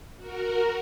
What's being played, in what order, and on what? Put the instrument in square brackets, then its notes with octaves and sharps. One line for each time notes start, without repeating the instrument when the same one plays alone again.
[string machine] F#4 A#4